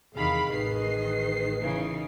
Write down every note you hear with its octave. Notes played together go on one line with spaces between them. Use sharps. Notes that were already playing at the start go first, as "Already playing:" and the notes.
E2 C3 D#3 G#4 F5 B5
A1 D#3 B4 D#5 C7
C#3 E3 D#4